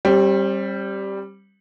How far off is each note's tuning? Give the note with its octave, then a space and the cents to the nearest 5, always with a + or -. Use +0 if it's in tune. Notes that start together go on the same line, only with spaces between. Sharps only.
G3 +0 C4 +40